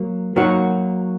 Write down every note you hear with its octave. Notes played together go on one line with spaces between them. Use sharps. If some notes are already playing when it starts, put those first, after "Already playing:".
Already playing: F#3 A#3
F#3 A#3 D#4 F#4